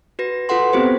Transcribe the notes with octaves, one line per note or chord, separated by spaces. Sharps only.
F#4 B4 A#6
F4 A4 B4 F#5 C6
B3 C4 F4 G4 C5